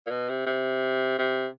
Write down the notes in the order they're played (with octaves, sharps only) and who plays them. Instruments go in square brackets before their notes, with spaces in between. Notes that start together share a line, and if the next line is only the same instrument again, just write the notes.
[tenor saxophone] A#2
B2
C3
C3
C3